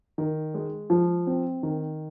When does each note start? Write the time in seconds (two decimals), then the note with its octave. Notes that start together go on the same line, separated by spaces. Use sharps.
0.18 D#3
0.54 G#3
0.90 F3
1.27 C4
1.63 D#3